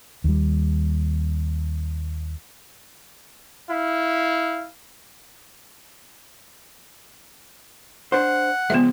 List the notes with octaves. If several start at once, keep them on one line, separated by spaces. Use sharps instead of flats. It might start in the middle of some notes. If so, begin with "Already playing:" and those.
D#2 G3
E4 F5
D4 C5 F#5
C#3 F3 G#3 B3 E5